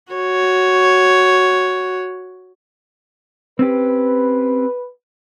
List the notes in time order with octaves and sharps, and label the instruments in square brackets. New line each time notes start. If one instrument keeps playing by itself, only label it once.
[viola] F#4 C#5
[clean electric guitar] C4 C#4 G4 [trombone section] B4